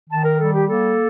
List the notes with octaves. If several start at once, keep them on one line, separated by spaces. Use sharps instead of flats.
D#3 A5
A#4
G3 A4
G4
A#3 A4